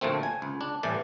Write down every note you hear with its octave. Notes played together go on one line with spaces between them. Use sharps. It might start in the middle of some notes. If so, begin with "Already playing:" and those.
D2 A#2 F3 A3 C4
G#5
C#2
D4
C2 A2 E3 D5